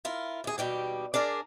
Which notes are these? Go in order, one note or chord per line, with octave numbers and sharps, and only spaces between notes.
E4 F4 A#4
D#2 G#4
D#2 B2 G3 G4
D4 G#4 A#4 D5